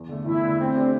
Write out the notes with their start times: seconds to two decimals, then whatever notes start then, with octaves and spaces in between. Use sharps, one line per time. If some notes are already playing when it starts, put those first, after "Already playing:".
Already playing: E2
0.08 D3 A3
0.26 E2 E4
0.43 D3 A3
0.59 A3 C4
0.75 D4 G4 D5